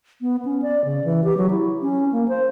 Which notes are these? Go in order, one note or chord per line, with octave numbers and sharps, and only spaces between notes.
B3
C#4
D5
C#3
E3
G4
F#3
E4
C#4
A#3
C5